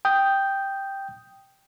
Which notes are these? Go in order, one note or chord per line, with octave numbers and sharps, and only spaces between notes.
G5 D#6 G6